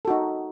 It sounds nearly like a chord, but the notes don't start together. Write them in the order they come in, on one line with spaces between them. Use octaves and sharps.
A4 F#4 D#4